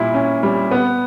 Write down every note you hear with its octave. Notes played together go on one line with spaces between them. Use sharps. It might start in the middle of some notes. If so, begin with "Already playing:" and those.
Already playing: A#2 G3 E4
C#4
G3
B3